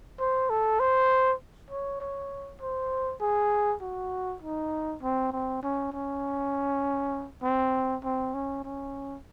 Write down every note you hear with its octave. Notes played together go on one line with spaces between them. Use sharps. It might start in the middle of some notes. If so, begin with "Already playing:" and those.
C5
A4
C5
C#5
C#5
C5
G#4
F#4
D#4
C4
C4
C#4
C#4
C4
C4
C#4
C#4